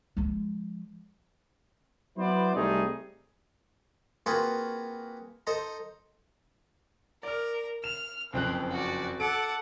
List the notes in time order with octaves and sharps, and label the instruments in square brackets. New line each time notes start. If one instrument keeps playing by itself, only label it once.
[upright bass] F3 G#3
[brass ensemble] F#3 B3 E4 B4 C5 D5
C2 G3 A3 C4 D#4 G#4
[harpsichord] A#3 C4 F4 F#4 G#4 B4
D#4 A4 C5 D#5 A#5
[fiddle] A#4 [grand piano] D5 F6
[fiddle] F6 [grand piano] E7
[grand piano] F#1 F2 F#6 [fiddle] C4
[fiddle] F#4 D5
[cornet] A4 [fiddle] F#5 D6 [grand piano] D7